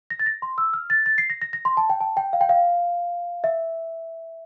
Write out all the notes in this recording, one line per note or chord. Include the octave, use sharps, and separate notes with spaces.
A#6
A6
A#6
C6
E6
F6
A6
A6
C7
A#6
A#6
A#6
C6
A5
G5
A5
G5
F5
G5
F5
E5